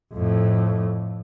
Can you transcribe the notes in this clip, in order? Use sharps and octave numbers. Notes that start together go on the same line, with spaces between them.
F2 A2